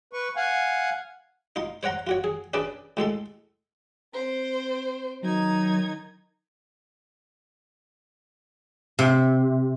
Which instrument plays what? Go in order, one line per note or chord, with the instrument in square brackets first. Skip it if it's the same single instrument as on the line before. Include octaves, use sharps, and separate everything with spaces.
[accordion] B4 C#6
F5 F#5 G#5
[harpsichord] D#4 F4 C6
C5 C#5 F#5 A#5 C6
F4 F#4 C#5
G#4
C#4 D4 G#4 B4 D5
A2 G#3 A4 C6
[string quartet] C4 C5
[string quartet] D#3 D#4 G#6 [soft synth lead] F#3
[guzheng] C3